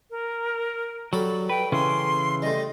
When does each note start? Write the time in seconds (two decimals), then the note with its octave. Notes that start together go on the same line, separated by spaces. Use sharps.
0.10 A#4
1.13 F#3 G3 A4 B5
1.49 B4 G5
1.72 C#3 E3 C#4 C6
2.42 G3 A3 D#5